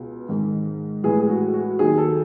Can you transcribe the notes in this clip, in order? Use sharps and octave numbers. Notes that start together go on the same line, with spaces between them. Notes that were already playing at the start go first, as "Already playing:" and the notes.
Already playing: C#2 B2 G#3
G#2 D#3 G#3
A2 E3 G#3 G#4
G#4
F#4
F#4
D#2 D#3 F#3 G#4
A4